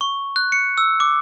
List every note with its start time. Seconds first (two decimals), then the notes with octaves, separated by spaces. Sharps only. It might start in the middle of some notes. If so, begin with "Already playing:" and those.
0.01 C#6
0.36 F#6
0.52 C#7
0.78 E6
1.00 D6